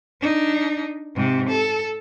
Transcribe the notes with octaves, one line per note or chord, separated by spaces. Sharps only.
D4 D#4
G#2 C3
A4